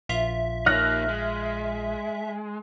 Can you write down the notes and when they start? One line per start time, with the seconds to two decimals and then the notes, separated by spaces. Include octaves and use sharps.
0.09 A#1 F4 E5
0.66 A#3 D#4 F6 F#6 A#6
1.08 G#3